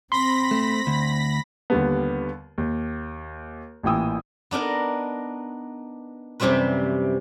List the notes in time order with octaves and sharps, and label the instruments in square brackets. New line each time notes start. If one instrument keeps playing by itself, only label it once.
[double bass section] C4 [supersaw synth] B5 A#6 B6 [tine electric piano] C6
[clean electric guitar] A3
D2
[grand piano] D#2 D3 G3 B3
D#2
A1 A#2 E3 G5 D#6 E6
[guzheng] B3 D4 D#4 A#4
F#2 C3 E3 G3 C4 B4